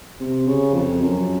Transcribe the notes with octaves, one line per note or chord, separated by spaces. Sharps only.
C3
C#3
F2
F#2